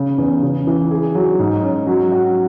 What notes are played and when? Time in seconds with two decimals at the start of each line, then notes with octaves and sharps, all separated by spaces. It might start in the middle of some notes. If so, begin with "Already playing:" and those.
Already playing: C#3
0.18 E2
0.43 C#3
0.67 E3
0.91 G#4
1.15 F#3
1.39 G#2
1.63 C#4
1.87 F#3
2.12 F#4